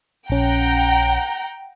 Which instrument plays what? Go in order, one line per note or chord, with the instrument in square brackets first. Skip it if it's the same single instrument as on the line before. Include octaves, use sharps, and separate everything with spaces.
[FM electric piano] A#1 C#4 [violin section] F#5 G5 A#5